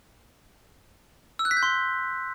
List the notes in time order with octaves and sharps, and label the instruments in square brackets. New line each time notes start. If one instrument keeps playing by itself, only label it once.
[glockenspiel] E6
F#6
B6
G6
C6